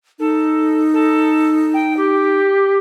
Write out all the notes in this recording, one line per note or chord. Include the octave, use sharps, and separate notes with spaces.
D#4 A4
A4
G5
G4